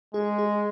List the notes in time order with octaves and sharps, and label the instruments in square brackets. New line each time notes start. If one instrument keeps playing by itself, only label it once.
[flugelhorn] G#3 [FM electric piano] G#4
[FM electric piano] G#4